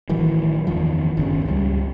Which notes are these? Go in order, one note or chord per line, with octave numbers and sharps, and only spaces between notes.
A1 D#3 E3 F#3
F#1 E2 D#3 F3
G1 D#2 C#3
C#2 F3 G3